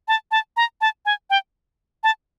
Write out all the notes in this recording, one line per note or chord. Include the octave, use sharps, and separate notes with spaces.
A5
A5
A#5
A5
G#5
G5
A5